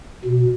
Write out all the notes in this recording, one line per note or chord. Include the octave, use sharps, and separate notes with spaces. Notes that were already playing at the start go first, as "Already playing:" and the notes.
B2